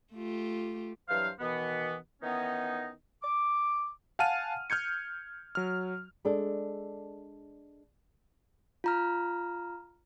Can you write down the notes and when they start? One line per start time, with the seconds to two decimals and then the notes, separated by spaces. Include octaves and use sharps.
0.13 A3 F4 G4
1.09 G2 E3 F#3 C5 F5
1.40 B2 D#3 E3 B3
2.22 D#3 E3 B3 C#4 D#4
3.23 D6
4.19 F5 F#5 G#5 A5 F6 D#7
4.70 F6 G6 G#6 C#7
5.55 F#3 F6
6.25 G#3 D4 A4
8.84 F4 A#5 F6